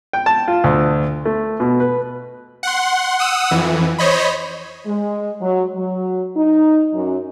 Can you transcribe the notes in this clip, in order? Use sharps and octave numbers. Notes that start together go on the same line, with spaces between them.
G5
A5
F4
D2
A3
B2
B4
F#5 C6
F#5 D#6 E6
F2 E3
C5 C#5 D#5 B5
G#3
F#3
F#3
D#4
F#2